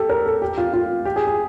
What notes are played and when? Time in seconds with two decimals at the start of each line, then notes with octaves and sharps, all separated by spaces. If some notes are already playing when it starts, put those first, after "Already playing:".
Already playing: G4 A4
0.09 A#4
0.26 A4
0.42 G4
0.58 F4
0.74 F4
1.05 G4
1.16 G#4
1.27 G#4